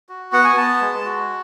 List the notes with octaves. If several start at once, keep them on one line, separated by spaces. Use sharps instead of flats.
F#4
B3 F#5
G#5
B3 A5
G#3
F#4